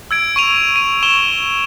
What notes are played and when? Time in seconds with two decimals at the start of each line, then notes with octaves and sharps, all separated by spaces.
0.11 E6 G#6 D7
0.36 C#6 D#7 F7
0.76 D#7
1.03 C#6 E7 G7